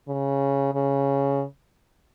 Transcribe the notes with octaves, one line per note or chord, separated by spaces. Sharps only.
C#3
C#3